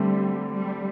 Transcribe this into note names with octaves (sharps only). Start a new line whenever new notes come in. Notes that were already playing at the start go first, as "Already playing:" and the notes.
Already playing: D3 G3 A3 C4 G4
G3